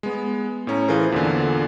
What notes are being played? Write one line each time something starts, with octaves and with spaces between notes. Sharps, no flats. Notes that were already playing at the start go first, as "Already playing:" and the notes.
G#3 B3
A2 C#4 A#5
E3 F4 G#4 A#4 C5
E2 A#2 D3